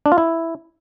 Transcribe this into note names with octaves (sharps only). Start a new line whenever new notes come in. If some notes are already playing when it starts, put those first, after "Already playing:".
D4
F4
E4